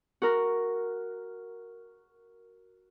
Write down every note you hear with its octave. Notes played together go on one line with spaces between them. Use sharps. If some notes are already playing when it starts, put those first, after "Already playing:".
F#4 A#4